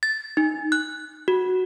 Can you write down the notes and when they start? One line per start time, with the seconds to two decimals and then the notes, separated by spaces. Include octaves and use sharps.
0.03 A6
0.37 D#4
0.72 F#6
1.28 F#4